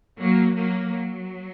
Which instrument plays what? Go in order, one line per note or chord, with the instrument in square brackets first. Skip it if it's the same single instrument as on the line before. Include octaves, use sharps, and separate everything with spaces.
[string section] F#3 A#3
F#3 A#3
F#3